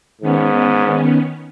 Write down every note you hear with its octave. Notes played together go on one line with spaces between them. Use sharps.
G#2 D#3 B3 C#4